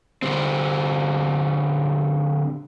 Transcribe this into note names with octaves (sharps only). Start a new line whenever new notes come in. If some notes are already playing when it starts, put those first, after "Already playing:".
D3 G3 C4